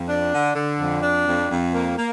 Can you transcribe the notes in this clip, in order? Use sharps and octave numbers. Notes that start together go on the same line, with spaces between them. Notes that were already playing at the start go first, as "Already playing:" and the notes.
Already playing: F2
D4
D3
D3
F2
D4
F2
F2
A#3
A#3